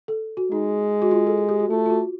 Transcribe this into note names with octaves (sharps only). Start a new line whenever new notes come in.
A4
F#4
G#3 D#4
F#4
F4
A4
G#4
G4
F#4
A3 F4
F4
F#4